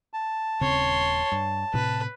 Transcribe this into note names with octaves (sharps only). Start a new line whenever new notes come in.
A5
D#1 C#3 C4 C#5 C6
G2
A2 C3 B4